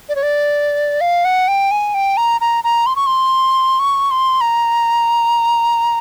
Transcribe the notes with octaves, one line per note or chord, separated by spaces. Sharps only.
D5
C#5
D5
F5
F#5
G5
G#5
G5
A#5
A#5
A#5
C6
C#6
C6
C#6
C6
A#5